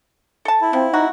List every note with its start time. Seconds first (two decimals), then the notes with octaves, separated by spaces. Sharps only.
0.45 A4 A5
0.61 E4
0.73 F3 C4
0.93 D#4 F#4